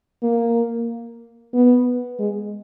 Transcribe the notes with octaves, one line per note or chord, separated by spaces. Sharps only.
A#3
B3
G#3